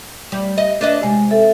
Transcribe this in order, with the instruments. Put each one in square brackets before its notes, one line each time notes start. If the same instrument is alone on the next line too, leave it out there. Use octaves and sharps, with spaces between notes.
[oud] G3
D#5
D4 B4 D#5
[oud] C3 [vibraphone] G#3
[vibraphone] A4 E5